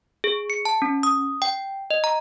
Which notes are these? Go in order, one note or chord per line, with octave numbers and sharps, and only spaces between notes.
G#4
C#7
A5
C#4
D#6
G5
D#5
A#5